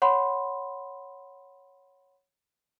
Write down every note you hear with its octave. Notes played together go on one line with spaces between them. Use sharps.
C#5 F#5 B5 C6